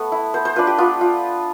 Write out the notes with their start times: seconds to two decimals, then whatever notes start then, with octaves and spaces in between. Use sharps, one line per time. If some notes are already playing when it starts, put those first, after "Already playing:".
Already playing: A3 B3
0.12 E4
0.34 B3 C5
0.45 C5
0.56 D4 F4 B4
0.67 G4
0.78 B3 F4
1.01 F4